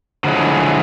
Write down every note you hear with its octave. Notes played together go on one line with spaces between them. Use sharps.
D3 F3 F#3 G#3 E4 G#4